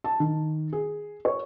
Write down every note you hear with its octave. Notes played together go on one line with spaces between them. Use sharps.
A5
D#3
G#4
C#5